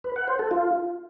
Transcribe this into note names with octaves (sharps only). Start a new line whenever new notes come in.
B4
F#5
C5
A4
F4